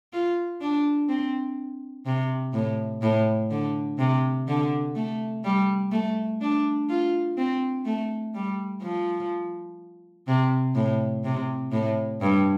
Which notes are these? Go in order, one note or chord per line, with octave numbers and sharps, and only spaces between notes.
F4
D4
C4
C3
A2
A2
D3
C3
D3
A3
G3
A3
D4
F4
C4
A3
G3
F3
C3
A2
C3
A2
G2